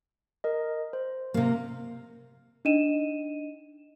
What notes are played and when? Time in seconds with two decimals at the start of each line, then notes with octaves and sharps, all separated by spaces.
0.44 A#4 D#5
0.93 C5
1.34 C3 A#3
2.65 D4 D#4 D#5 D#7 E7